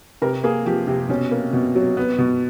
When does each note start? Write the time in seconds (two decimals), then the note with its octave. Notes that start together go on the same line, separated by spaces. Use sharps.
0.22 C3 A#4
0.44 A#3 G#4
0.66 F3 G4
0.87 C3
1.09 B2 C#4
1.31 A#3
1.53 B2
1.75 F#3
1.97 B3
2.18 B2